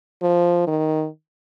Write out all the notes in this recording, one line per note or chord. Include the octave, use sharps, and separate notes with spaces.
F3
D#3